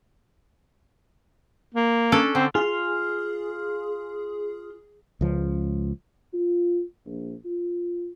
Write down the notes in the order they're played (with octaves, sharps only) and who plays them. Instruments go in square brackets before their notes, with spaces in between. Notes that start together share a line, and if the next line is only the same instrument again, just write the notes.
[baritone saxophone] A#3
[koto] C#4 D4 A4
[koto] D3 [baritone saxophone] C4
[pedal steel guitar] F4 F5 [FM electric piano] G#4
[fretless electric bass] C#2 F3
[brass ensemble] F4
A#1
F4